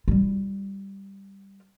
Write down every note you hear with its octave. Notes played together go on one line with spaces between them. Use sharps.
G3 F4